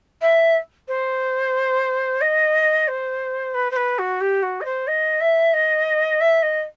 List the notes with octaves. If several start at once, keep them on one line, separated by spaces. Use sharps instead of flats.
E5
C5
D#5
C5
B4
C5
B4
F#4
G4
F#4
D#5
C5
D#5
E5
D#5
E5
D#5